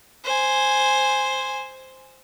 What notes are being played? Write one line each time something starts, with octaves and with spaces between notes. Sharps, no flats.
C5 G#5